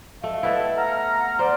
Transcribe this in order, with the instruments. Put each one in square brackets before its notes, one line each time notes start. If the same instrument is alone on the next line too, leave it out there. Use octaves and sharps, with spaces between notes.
[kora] A3 [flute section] D#5 F5
[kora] A3 B3 E4 [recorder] A4
[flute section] F#5 F6 [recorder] A#5
[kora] C5 [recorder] D5